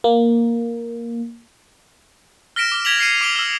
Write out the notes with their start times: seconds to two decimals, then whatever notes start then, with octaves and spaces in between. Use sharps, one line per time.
0.04 A#3
2.56 F6 A#6 B6 D7 E7
2.72 D6 F6
2.85 G#6 B6 F7 F#7
2.99 F6 C7 C#7 D#7
3.21 D6 D7 F7 G7
3.36 E6 F6